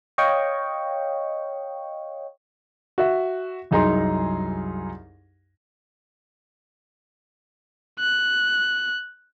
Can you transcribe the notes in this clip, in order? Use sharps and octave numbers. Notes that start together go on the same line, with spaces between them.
C#5 D#5 F5 G5 C#6
F#4 E5
C2 F#2 D#4 G#4 A#5 C6
F#6